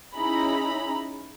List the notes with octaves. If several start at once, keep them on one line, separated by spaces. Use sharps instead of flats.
C#4 D#4 E4 G#4 A#5 B5